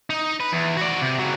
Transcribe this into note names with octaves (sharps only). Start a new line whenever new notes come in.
D#4
B4
E2
F#4 D5
C3
C#3 F#3